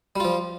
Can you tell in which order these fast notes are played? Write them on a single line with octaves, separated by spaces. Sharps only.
G3 F4 F3